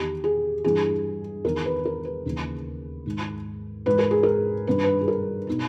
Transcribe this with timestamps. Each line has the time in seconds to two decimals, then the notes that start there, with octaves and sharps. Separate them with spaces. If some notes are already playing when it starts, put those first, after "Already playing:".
Already playing: E2 D#3 G4
0.24 G#4
0.64 G2 E3 G#4
1.44 E2 D#3 A#4
1.65 B4
1.85 A#4
2.05 B4
2.25 D#2 C#3 E3
3.06 G#2 D#3
3.86 G#2 E3 B4
3.99 A#4
4.11 G#4
4.23 A#4
4.67 G2 D#3 B4
4.83 B4
5.01 G#4
5.08 A#4
5.47 B2 D#4